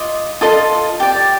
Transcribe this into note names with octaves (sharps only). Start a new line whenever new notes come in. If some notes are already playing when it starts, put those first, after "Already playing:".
Already playing: F4 D#5 D6
F4 A4 D#5 D#6
G4 D5